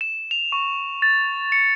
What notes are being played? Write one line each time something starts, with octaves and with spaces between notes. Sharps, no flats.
E7
F7
C#6
A6
C#7